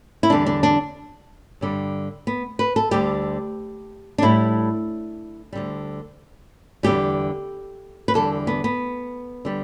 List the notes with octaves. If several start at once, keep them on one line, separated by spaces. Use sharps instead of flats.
E4
E2 D3 G3 D4
D4
D4
G2 D3 G3
B3
B4
A4
D2 D3 G3 G4
D4
A2 G3 E4
D2 D3 G3
E2 D3 G3 G4
B4
E2 D3 G3 A4
B3
B3
D3 G3